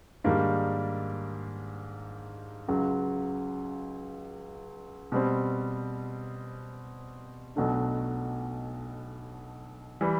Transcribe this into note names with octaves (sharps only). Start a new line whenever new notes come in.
G#2 D#3 G3 A#3 D4
C#2 C#3 F#3
B2 G3 C4
B1 B2 F#3 A3 D4
E3 G3